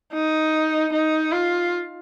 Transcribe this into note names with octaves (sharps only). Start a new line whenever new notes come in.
D#4
D#4
F4